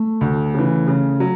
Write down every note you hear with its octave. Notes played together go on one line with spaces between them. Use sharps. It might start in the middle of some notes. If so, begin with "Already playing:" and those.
Already playing: A3
D2
C#3 E3
C#3
F#3